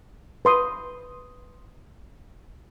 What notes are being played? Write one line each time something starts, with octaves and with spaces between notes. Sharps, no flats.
B4 C6 D#6